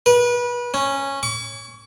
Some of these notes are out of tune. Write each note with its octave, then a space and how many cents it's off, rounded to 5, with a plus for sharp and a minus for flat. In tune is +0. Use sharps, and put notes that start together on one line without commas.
B4 -30
C#4 -10
C#6 +45